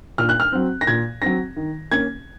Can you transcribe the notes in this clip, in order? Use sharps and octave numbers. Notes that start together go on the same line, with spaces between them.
A#2 F6
F#6
F6
F#3 C4
A#6
A#2 G#6
F#3 C4 A#6
D#3
A#3 C#4 G#6